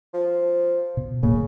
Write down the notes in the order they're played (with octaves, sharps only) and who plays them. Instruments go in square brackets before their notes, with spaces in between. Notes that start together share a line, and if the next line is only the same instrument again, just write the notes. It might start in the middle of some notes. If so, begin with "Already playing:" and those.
[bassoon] F3
[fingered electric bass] B2
[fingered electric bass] D1 A2 A#3 [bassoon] C#3